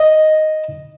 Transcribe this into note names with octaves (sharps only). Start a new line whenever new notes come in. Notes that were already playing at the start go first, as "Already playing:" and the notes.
Already playing: D#5